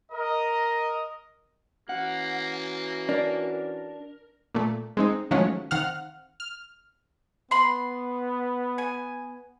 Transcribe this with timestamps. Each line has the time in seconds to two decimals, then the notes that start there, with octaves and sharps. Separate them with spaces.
0.12 A#4 D#5
1.89 E3 A#3 C#4 F#4 F#5
3.09 D4 A#4
4.55 A#2 A3
4.97 G#3 C4 D#4
5.31 D#3 F3 F#3 G#3 A3 C#4
5.71 D#3 C4 F5 F#5 F6
6.40 F6
7.51 B3 B5 C6
8.78 G#5